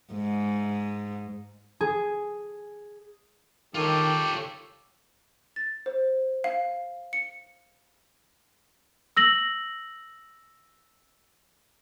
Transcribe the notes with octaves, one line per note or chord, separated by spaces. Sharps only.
G#2
G#4
D#3 F4 G4 A4 C#5
A6
C5
F5
C#7
E6 A#6 F#7